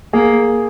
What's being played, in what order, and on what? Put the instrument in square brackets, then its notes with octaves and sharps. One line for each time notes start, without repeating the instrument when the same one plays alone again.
[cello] A#3 [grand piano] G#4